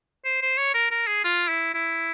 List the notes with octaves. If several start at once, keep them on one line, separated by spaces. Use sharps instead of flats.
C5
C5
C#5
A#4
A#4
G#4
F4
E4
E4